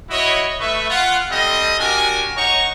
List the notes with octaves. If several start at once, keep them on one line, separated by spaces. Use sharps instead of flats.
E4 F#4 C#5 D#5
A3 B4 E5 C#6
F4 F#5
G3 C4 A4 D#5
D4 F#4 G4 A#4 G#5
D#4 C#5 F#5 A#5 C#6